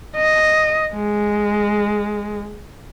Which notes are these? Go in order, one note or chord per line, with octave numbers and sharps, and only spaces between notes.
D#5
G#3